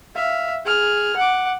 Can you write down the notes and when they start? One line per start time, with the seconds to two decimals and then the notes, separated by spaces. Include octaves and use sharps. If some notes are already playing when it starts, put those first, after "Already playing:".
0.15 E5 F5
0.65 G#4 F6
1.16 F#5 D6